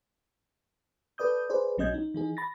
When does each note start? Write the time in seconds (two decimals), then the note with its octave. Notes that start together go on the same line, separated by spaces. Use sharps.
1.18 A4 B4 D5 D#6 G6
1.50 G#4 B4 C5 D5
1.78 B1 F#3 C#4 D#5 G6 G#6
1.94 D#4
2.14 E3 D#4 G#4
2.37 B5 A6 A#6